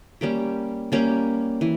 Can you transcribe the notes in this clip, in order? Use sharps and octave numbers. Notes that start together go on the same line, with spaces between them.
G3 A#3 C#4 G4
G3 A#3 C#4 G4
E3